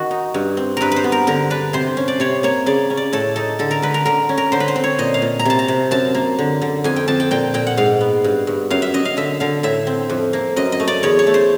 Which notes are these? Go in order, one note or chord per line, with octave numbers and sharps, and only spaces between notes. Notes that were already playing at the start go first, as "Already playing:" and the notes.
Already playing: D#3 F#4
D#4
G2
C4
G2 A#4 B4
B4 C5
B3
A#4
D3 A#4
D4 B4
C3 C5
C#4
D5
C3 C#5
A#3 C#5
C#3 D5
C#4
D5
A2 A4
D#4 A4
D3 A4
A#4
D3 B4
A#4
D3 A#4
C#4
A#4
D3 C5
B4
C5
C4
C#5
A#2 D#5
F5
A#2
A#5
C3 A5
A#5
C3
F#2 A5
A#3
D3
D3
F2 G#5
G5
F2 A5
G5
A#2 G5
A#2 G5
F#5
G#2 F5
B3
G2
G2
F#2 F5
E5
F#2 D#5
F5
D3 E5
D3 F5
A2 E5
C4
F2
A#3
F#2 D#5
D#5
A3
D5
E2 C#5
C#5
A3
C5